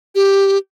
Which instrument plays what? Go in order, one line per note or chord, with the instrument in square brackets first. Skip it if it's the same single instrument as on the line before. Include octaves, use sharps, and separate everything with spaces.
[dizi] G4